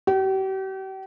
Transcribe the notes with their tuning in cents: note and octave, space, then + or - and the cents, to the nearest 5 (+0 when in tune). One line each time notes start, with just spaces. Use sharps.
G4 -40